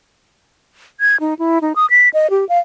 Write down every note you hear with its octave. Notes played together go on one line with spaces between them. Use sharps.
G#6
D#4
E4
D#4
D#6
B6
D#5
G4
F5